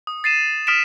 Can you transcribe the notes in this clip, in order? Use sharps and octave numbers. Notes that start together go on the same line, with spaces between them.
D#6
A6 C7 D#7 E7
D#6 F6 B6 D7 E7